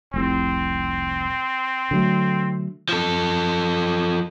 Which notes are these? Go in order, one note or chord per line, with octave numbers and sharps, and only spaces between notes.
F1 C2 C4
D3 F#3 A3
F3 A4